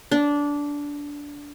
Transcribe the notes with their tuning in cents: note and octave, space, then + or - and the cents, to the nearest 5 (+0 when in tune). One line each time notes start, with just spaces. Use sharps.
D4 -15